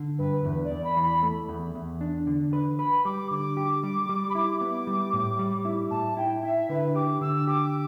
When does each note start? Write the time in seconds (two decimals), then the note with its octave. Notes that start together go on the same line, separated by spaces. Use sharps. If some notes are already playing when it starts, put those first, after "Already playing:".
Already playing: D3
0.18 G2 B4
0.45 E2 B4
0.64 D5
0.71 E2
0.84 B5
0.97 E3
1.03 B5
1.23 A3
1.49 E2
1.75 E2
2.01 D4
2.27 D3
2.53 B4
2.79 B4 B5
3.05 G3 D6
3.31 D3 D6
3.57 G4
3.83 G3
4.09 G3
4.29 B5
4.35 E4 D6
4.61 B3
4.87 G3
5.13 A2
5.39 G3
5.65 E4
5.91 A2 A5
6.17 E4 G5
6.43 E4 E5
6.69 D3 B4
6.95 G4 D6
7.21 D3 E6
7.47 G4 D6